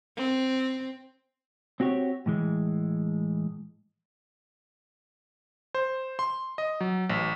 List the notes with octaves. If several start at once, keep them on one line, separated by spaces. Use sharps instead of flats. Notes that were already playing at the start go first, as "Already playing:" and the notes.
C4
C4 F#4 G4 C#5
A2 E3 G#3
C5
C6
D#5
F#3
A1